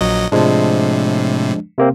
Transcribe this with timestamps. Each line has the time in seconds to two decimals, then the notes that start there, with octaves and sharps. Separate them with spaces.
0.01 A#1 F#3 D#5
0.32 A2 C3 F3 G#3 D4
1.78 C3 A#3 C4